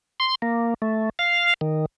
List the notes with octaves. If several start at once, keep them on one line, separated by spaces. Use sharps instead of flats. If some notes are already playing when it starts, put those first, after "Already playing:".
C6
A#3
A3
F5
D#3